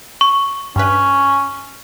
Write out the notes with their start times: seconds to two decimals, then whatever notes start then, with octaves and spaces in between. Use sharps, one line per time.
0.21 C#6
0.76 G2 C#4 B4